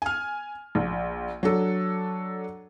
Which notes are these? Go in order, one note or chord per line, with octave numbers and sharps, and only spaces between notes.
G#5 F6
A#1
F#3 D4 A4